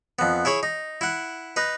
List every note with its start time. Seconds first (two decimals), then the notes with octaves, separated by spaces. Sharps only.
0.19 F2 B3
0.45 E4 G#4 C#5 B5
0.63 D#4
1.01 E4 F#5
1.56 D#4 B4